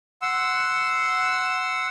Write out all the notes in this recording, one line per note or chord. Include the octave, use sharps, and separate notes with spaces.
F#5 C6 E6